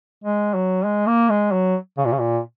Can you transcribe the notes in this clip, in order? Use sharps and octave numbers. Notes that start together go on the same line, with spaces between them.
G#3
F#3
G#3
A#3
G#3
F#3
C#3
A#2
C#3
A#2